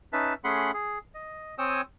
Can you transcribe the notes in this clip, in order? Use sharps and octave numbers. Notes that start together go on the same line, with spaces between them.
C#4 D#4 B4 E5 A5
A3 C#4 G#4 F#5 B5 C6
G#4
D#5
C4 C#5 G5 G#5 D#6 E6